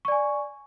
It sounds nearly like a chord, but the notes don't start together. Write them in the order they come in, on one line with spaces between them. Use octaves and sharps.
C#6 D5 G#5